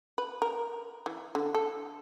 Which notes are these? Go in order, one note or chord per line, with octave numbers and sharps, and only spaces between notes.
B4
A#4
E3
D3
A4